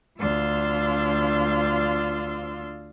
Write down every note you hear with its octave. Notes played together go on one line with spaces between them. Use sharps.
D2 D4 F4 F5 C6 E6